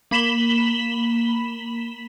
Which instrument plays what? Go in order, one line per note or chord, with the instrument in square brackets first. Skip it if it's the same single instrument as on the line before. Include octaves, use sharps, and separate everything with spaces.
[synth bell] A#3 B5 B6 E7 F#7 G7